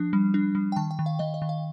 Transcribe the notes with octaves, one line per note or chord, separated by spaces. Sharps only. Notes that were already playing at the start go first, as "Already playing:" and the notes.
Already playing: F3 D4
G3
D4
G3
G5
D#3 A5
G5
D#3
F5
D#3 D#5
D#5
D#3
F5